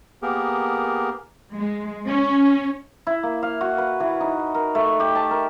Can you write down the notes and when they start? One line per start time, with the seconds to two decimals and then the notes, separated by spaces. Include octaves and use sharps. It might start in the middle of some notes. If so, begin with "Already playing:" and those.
0.22 A#3 B3 G4 G#4 A#4
1.56 G#3
2.08 C#4
3.07 E4
3.23 A#3
3.43 F5
3.61 F#4
3.78 B4
4.00 E3
4.20 D#4
4.54 A#4
4.75 A3
5.00 G4
5.15 A5
5.31 A#4